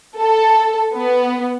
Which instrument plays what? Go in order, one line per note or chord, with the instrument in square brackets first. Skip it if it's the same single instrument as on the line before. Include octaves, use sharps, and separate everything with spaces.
[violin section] A4
B3